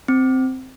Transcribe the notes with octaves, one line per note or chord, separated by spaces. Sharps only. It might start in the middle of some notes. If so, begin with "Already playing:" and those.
C4